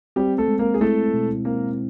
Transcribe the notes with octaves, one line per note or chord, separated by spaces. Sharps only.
G3 C4 G4
A3 A4
G#3
A#3 A#4
G#4
A3 E4 A4
B2
A#3 C4 A#4